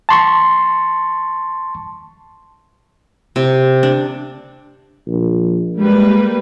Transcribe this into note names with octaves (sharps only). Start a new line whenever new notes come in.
A5 C6 C#6
C3
D4
A#1
G3 G#3 A#3 B4